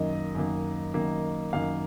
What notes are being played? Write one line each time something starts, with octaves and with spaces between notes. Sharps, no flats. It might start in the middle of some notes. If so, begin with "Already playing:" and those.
Already playing: F#2 D#3 A#3 D#5
F#2 D#3 A#3
F#2 D#3 A#3
F#2 D#3 A#3 F5